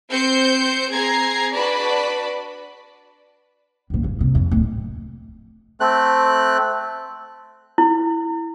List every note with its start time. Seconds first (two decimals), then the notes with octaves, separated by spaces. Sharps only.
0.12 C4 C5 G6 C#7
0.92 C4 G#4 A#5 G#6 C7
1.55 D4 F#4 B4 D5 A5 B5
3.90 C#2 A#2
4.04 E1
4.21 C3
4.35 F2
4.51 D1
5.80 A3 C4 F#6
7.78 E4